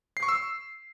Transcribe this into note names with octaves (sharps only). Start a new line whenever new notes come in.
C7
C#6
E6